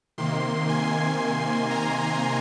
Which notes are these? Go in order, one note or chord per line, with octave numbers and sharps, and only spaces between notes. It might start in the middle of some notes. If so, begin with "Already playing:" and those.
C3 D#3 A#3 C6
G#5
A#5